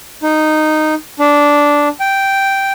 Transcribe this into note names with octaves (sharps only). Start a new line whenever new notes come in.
D#4
D4
G5